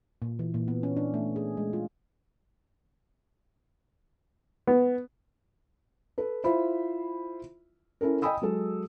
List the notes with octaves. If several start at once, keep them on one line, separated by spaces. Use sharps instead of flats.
A#2
E3
A#2
B3
C#4
D4
A3
G#4
G#3
F4
B3
A4 B4
E4 F4 C5 E5 B5
C#4 E4 A4 A#4
D#5 G5 G#5 B5 D#6 E6
F#3 G#3 A4